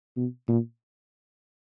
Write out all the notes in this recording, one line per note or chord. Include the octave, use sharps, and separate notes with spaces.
B2
A#2